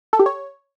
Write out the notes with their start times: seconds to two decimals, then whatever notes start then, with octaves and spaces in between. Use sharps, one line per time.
0.13 A4
0.19 G4
0.26 C#5